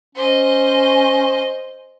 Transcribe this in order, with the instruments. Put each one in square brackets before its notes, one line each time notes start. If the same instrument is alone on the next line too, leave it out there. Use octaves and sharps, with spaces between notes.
[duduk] C#4 [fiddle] C5 D#5